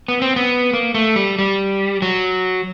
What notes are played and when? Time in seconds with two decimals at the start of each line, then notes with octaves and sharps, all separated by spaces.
0.08 B3
0.22 C4
0.36 B3
0.73 A#3
0.94 A3
1.16 G3
1.39 G3
2.02 F#3